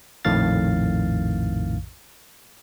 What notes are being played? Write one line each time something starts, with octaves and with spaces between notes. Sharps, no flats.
A#1 F2 A2 D#3 F5 A6